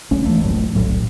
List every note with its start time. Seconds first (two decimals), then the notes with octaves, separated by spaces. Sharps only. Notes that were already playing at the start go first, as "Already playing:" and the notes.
0.11 C#2 G#3 C#4
0.25 D2 E3 F3 A3
0.41 D#1 A#1 F#2 A2
0.75 D#1 B1 A2 F#3